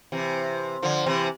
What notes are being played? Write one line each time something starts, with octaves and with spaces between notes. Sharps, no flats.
C3 E3
D3 F3
C3 E3